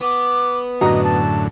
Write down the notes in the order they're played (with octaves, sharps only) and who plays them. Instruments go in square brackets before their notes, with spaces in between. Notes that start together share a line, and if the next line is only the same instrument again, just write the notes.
[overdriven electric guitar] B3 [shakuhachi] D6
[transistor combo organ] F#2 A2 D3 [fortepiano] F#4 A#5 D#6 [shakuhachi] D#5
[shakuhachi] A5